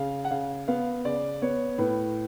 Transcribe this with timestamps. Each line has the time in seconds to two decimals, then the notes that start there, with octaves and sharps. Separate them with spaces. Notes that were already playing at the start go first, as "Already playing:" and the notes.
Already playing: C#3 F5
0.24 F#5
0.31 C#3 F5
0.68 B3 F5
1.05 C#3 D5
1.42 B3 C#5
1.78 A2 B4